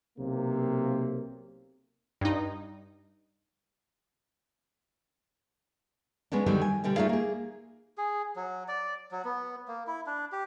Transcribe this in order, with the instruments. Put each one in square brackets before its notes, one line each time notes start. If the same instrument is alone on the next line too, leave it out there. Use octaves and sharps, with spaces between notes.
[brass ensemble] B1 C3 A#3
[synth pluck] G2 D#4
[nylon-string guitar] G#3 B3 C#4 D4
D3 D#3 F#3 G3 D4
G#5
B2 D3 G3 G4
A3 D#4 F4 G#4 D5 F5
A#3 G#4
[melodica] G#4
F#3
D5
F#3
B3
A#3
E4
D4
G4